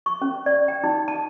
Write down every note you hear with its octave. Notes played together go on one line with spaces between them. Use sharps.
C#6
C#4
D5
G5
D#4
A5